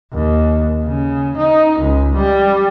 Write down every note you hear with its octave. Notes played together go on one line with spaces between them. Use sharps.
D#2
C#3
D#4
C#2
G3